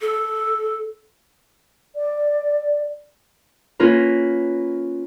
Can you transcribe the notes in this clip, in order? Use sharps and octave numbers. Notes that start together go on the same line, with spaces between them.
A4
D5
A#3 C#4 F4 A#4 B4